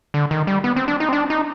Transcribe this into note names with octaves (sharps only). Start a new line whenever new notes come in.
D3
D#3
G3
B3
C4
D4
D#4
C4
D4
D#4